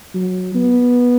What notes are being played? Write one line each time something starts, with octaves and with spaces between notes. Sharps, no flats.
F#3
B3